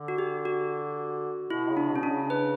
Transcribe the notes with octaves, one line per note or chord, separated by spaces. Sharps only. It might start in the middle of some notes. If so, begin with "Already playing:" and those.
Already playing: D3
F#4
G4
F#4
B2 E4
C#3
D4
B2
C#4
D4
C#3
B4